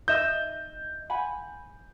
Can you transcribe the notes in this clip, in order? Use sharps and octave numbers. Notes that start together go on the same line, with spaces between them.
D#4 D#5 E5 G6
F#5 G#5 B5